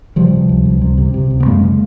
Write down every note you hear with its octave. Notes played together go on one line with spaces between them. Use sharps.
C3 F3 G3
C3
C#2
C#2
C3
C3
C3
C#2
B3
F#2 G#3 A#3
C#3